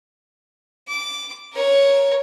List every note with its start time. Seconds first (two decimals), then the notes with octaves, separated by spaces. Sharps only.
0.88 D6
1.53 A#4 C#5